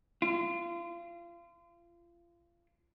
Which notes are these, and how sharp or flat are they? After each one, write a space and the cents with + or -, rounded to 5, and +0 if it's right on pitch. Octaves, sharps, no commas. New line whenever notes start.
F4 -30